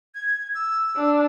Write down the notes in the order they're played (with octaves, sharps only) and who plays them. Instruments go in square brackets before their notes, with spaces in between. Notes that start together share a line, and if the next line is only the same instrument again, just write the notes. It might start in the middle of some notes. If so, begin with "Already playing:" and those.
[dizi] G#6
E6
[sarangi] D4